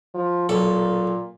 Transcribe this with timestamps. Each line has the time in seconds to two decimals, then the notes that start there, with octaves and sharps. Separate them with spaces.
0.14 F3
0.49 B1 A#2 A4